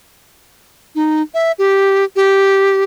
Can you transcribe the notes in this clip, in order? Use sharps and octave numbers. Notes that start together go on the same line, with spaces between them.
D#4
E5
G4
G4